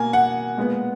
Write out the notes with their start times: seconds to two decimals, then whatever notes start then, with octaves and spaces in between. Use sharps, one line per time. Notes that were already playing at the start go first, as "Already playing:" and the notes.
Already playing: B2 A#3 G#5
0.13 F#5
0.57 A#2 G#3 B3